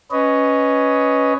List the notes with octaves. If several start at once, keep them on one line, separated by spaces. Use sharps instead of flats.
C#4 B4 C#5 D#5